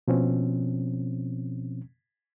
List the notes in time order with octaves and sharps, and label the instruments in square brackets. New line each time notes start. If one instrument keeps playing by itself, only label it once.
[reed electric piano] B2 F3 C4 C#4